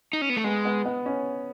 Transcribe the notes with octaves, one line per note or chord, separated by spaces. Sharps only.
D#4
C#4
B3
A3
G#3 B3
B3
B3
C#4